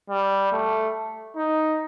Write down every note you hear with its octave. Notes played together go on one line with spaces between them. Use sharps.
G3
A3
D#4